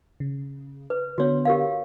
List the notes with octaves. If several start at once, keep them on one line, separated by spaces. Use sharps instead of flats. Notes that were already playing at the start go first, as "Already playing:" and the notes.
C#3
B4
D3 B3 F#4 C#5
G4 A#4 F5